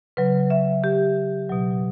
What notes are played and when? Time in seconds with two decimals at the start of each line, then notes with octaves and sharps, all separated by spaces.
0.17 C#3 F#3 B4
0.50 E5
0.84 G4
1.49 B2 F#3